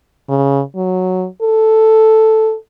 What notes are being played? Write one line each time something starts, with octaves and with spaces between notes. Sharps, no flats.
C#3
F#3
A4